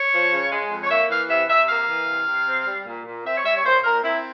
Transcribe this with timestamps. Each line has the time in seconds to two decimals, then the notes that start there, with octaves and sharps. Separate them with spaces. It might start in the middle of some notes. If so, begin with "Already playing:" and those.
Already playing: C#5
0.13 F3
0.32 C#3
0.51 G#3
0.71 F2
0.84 C#5
0.90 A#3 E5
1.10 E3 F5
1.29 C3 E5
1.49 C3 E5
1.69 A#3 F5
1.88 E3
2.08 C3
2.27 C3
2.47 C4
2.66 G3
2.86 A#2
3.06 A#2
3.25 C4 E5
3.38 C#5
3.44 G3 E5
3.56 C#5
3.64 A#2 C5
3.84 A#2 A#4
4.03 C4 E4